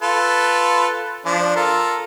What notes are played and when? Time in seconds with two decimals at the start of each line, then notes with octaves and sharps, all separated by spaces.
0.02 F4 A4 B4
1.26 F3 D4
1.56 F4 A4 A#4